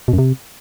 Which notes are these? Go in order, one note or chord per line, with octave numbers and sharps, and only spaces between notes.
B2
F#2
C3